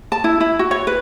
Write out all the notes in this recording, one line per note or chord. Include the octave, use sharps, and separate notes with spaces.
A5
E4
E4
F#4
C#5
B4